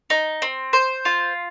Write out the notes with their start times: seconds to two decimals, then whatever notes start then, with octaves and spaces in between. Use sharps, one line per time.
0.10 D#4
0.42 C4
0.73 C5
1.05 F4